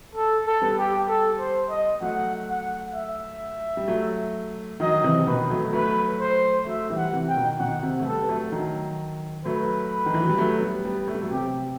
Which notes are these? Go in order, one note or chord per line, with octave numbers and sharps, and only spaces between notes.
A4
A4
G3 B3
G4
A4
C5
D#5
F#3 A3 F#5
F#5
E5
G3
F#3 A3
D#3 F#3 D#5
C3 E3
B2 D#3 B4
F#3 A3
F#3 A3 B4
C5
F#3 A3 E5
E3 G3
F#5
C3 E3
G5
B2 D#3
B2 D#3 F#5
C3
A3
G3 B3 A4
B3
F#3 A3
D#3 F#3
F#3 A3 B4
D#3
E3
F#3
G3
F#3 A3
G3 B3
G3 B3
A3
G3
F#3 A3
C3 G4